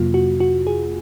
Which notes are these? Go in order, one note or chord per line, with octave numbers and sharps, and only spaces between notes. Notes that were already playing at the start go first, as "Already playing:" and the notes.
Already playing: F2 C3 F#3 A#3 F4
F#4
F#4
G#4